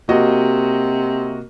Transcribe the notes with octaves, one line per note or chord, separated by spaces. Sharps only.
C3 A#3 F#4 D#5